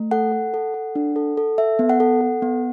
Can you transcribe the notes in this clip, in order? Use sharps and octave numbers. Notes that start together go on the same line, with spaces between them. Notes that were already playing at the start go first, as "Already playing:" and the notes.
Already playing: A3
A4 F#5
A4
A4
A4
D4
A4
A4
A4 E5
B3
F#5
A4
A4
B3